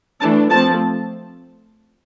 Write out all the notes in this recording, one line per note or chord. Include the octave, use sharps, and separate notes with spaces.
E3 A3 D4 A5
F3 A3 C4 A5